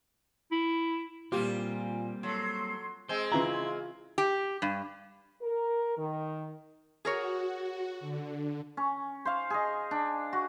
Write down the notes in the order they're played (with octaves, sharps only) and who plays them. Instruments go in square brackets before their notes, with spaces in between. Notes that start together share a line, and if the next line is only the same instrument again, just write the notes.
[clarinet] E4
[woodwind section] A#2 [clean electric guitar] G3 A#3 C4 [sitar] F4 [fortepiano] G4
[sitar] F#3 [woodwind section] A4 C6
[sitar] G#3 C4 [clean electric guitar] C5
[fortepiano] C#3 E3 A#5 [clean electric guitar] E4 [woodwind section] F4
[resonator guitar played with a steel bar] G4
G2
[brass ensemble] A#4
D#3
[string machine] F#4 [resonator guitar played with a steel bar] G#4 A#4 C#5
[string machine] D3
[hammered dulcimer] C#4
C5 F5
G#4 D#5
D4
F#4